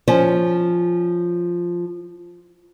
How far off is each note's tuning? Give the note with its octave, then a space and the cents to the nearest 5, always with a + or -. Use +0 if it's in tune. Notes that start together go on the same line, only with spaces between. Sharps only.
F3 +0 C#4 +0